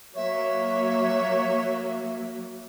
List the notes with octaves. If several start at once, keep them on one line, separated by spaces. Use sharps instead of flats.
F#3 A#3 C#5 E5